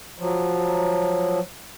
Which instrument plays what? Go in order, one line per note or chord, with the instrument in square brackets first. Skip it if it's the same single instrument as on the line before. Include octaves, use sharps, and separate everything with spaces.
[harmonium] F3 F#3